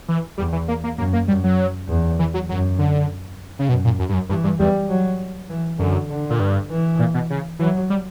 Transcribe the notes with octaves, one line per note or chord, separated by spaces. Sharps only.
E3
E2 G3
E3
A#3
A#3
F#2 A#3
A#3
F#2 G3
F#3
E2
E3
F#3
F#2 F#3
D3
C#3
F#2 B2
A#2
F#2
G2
F#2
G2 E3
G2
E2 G3
F#3
E3
F#2 D3
D3
A#2
G2
E3
A#2
B2
C#3
E3 F#3
G3